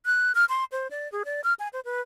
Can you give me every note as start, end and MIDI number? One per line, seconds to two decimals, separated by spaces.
0.05 0.32 90
0.35 0.45 89
0.49 0.64 84
0.72 0.87 72
0.90 1.10 74
1.12 1.23 68
1.25 1.41 74
1.44 1.53 89
1.59 1.68 80
1.73 1.80 72
1.85 2.01 71